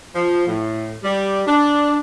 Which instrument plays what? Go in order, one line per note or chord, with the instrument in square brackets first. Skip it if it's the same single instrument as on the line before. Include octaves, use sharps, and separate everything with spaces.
[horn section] F3
A2
G3
D4